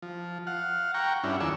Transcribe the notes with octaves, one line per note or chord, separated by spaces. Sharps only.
F3
F5 F#5
F#5 G5 A#5 C#6
G2 C#4 D4 E4
D#2 F3 G#4 D5 C#6 E6